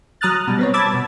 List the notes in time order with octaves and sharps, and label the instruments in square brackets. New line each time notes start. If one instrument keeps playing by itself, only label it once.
[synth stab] F#3 A#5 D#6 F6 F#6 A6
B2 G3
B3 C4 C#5
A5 B5 D6 E6 G#6 A6
B2